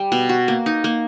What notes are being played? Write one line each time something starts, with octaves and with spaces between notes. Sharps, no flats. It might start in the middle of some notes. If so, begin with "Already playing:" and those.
Already playing: G3
B2
F#4
A#3
D#4
A#3